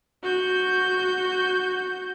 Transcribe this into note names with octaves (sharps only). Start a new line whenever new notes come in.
F#4 G6